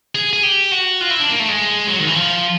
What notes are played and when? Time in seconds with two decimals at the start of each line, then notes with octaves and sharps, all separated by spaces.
0.15 G#4
0.33 G#4
0.43 G4
0.72 F#4
1.01 F4
1.10 E4
1.20 D4
1.29 A#3
1.40 A3
1.48 G#3
1.88 F#3
1.99 D#3
2.07 E3
2.15 F3